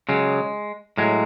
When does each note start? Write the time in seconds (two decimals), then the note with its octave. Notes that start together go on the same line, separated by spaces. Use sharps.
0.09 C#3 F#3 G#3
0.98 A2 F#3 G#3